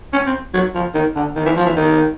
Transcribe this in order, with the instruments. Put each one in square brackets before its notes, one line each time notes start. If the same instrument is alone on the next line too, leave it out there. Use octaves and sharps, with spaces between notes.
[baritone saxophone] C#4
C4
F#3
F3
D#3
D3
D#3
E3
F3
E3
D#3